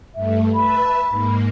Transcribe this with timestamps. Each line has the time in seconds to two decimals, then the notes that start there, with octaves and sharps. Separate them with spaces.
0.15 G2 A3 E5
0.55 B4 E5 A5 B5
1.09 G#2 A#3